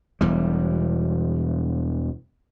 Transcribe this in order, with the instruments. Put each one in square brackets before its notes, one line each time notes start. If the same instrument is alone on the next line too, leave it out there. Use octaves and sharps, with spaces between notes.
[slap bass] E1 E2 G3